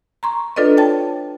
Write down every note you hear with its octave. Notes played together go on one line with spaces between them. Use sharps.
A#5 C6 C#6
D4 F4 A4 B4 D5 D#5
C#5 G5 A5 A6